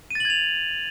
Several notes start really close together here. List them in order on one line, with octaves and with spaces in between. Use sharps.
D#7 A6 F#7 G#6 F7